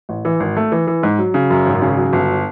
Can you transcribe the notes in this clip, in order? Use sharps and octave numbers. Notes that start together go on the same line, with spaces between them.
A1
E3
G#1
A3
E3
E3
G#2
F#3
C#3
F#2
G#1
C#3
F#3
G1